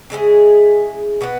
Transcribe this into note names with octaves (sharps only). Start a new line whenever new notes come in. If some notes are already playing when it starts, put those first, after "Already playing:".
C#3 G#3 E4 G#4
B2 B3 F#4